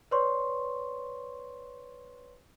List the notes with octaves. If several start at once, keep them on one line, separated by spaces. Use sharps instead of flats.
B4 C#5 D5 C6 C#6